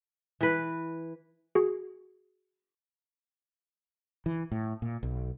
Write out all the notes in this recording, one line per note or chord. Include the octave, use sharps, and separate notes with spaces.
E3 B4
F#4 G#4
E3
A2
A#2
B1